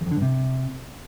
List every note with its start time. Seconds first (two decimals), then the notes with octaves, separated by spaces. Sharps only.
0.01 E2
0.06 F2
0.11 D3
0.17 G2
0.22 C3